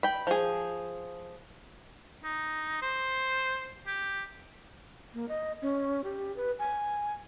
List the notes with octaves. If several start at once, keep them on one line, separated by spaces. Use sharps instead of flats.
G5 B5
F3 G#4
D#4
C5
G4
A#3
D#5
C#4
G4
B4
G#5